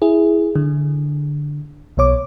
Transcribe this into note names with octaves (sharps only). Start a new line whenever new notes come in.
E4 G#4
D3
B1 B2 C#5 D6